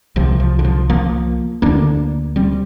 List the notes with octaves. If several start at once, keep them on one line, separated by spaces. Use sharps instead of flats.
C2 C3 F3
F3
D3
F3
F3 A#3
D2 D3 A#3 D4
G3 C4